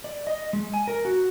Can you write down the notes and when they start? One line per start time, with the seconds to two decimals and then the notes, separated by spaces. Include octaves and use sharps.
0.04 D5
0.27 D#5
0.53 G#3
0.74 G#5
0.88 A#4
1.05 F#4